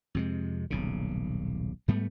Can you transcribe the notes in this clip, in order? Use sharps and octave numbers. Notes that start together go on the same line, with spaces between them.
F2 C3 G#3
D#1 B1 C#3
G#2 G3 A3 B3